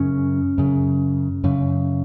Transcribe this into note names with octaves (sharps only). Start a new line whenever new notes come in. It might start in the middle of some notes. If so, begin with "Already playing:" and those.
Already playing: F#2 C#3 C#4
F#2 C#3
F#2 C#3